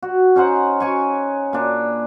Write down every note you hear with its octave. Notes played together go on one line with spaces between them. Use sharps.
F#4
C#4 D#4 C5 F#5
C#5 G#5 C#6
A#2 D4